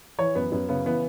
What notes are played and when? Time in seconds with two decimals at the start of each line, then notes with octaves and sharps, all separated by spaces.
0.18 E3 C#5
0.35 F#2 B3
0.52 F#2 B3
0.69 C#3 B3
0.85 E3 B3